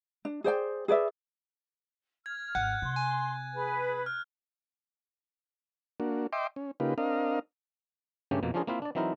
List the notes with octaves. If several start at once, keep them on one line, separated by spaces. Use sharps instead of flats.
D4
G#4 C5 D5 G5
G#4 B4 D5 E5
F6 G#6
G#1 F#5 F#6
C3 C6
G#5
G#4 B4 B5
F6
A#3 D4 F#4
D#5 E5 G5 C6 D6
C#4
C#3 A#3 D#4 F4 G4 B4
C4 D4 A#4 D#5 F5
G2 C#3 A3 A#3 C#4 G4
F2 B2 A#3
F3 C#4 D4 F4 G#4 A#4
A#3 C4 E4 F4 E5 F5
D4 D5
E3 F#3 C4 D#4 E4 A#4